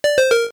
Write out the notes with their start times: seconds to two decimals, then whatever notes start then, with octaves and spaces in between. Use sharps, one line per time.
0.04 D5
0.18 C5
0.31 A#4